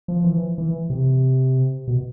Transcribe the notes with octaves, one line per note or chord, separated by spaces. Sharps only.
F3
E3
E3
C3
B2